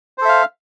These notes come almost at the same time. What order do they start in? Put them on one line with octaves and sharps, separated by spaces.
C5 A4 E5 F5